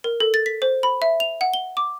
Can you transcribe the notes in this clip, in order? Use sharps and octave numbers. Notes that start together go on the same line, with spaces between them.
A#4
A4
A6
B6
C5
B5
E5
F7
F#5
G7
D6